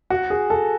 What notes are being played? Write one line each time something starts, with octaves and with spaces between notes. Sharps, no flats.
F#4
G#4
A4